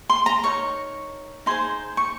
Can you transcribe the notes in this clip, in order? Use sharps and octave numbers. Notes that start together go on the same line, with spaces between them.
C6
A#5
D#4 A#4 C#5 C#6
D#4 G#4 C5 C6
C#6